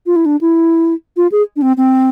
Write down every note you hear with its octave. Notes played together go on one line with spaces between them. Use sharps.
F4
E4
D4
E4
F4
G#4
D4
C4
C4